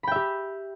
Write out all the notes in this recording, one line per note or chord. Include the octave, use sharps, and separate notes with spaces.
G4 E5 G5 B5